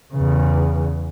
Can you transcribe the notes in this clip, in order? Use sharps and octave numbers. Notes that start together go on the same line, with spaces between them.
E2 C#3